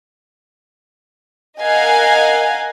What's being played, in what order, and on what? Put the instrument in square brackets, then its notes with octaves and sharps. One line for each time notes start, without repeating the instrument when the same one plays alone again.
[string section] A#4 D#5 F5 F#5 G#5